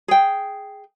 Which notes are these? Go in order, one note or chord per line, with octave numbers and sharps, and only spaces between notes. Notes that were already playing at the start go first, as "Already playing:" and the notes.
G#4 G5